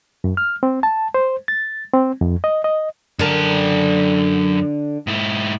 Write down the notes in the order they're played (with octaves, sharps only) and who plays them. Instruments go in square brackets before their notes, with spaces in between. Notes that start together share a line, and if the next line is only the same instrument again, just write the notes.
[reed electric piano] F#2
F6
C4
A5
C5
A6
C4
F2
D#5
D#5
[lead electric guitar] F#2 A5 [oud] D3 A#4
[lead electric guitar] G#2 E4